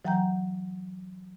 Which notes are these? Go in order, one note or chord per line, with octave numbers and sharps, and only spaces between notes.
E3 F#3 F#5 G5 A#5 G6